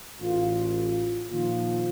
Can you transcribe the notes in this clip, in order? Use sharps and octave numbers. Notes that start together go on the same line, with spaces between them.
A1 F4
A#2 D#3 F3 F4